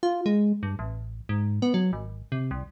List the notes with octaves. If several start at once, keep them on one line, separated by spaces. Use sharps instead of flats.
F4
G#3
G2
A1
G#2
B3
F#3
G#1
C3
C2